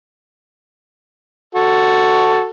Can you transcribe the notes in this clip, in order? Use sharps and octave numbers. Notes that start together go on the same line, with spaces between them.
F#4 A4